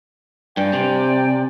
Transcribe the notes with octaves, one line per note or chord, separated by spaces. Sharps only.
G2 D5 G5 G#5
C3